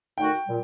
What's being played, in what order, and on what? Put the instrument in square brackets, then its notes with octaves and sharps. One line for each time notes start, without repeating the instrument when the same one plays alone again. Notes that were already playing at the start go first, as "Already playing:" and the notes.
[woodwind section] D3 A3 D#4 F#4 A#4 [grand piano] G5
[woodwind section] A#2 G3